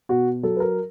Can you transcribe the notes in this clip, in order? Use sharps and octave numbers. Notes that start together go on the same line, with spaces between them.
B2 F#4
F#3 A4
B4
A#4